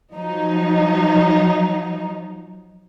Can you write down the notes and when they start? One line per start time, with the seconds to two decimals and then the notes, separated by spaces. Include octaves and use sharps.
0.12 F3 F#3 D#4